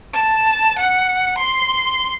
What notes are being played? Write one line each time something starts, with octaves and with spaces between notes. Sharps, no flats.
A5
F#5
C6